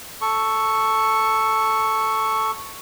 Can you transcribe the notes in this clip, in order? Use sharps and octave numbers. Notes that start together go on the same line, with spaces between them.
A4 C#6